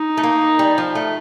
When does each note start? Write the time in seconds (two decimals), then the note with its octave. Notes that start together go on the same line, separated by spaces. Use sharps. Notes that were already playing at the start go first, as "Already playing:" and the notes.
Already playing: D#4
0.17 A3
0.23 A#3
0.59 G3
0.78 F3
0.95 A3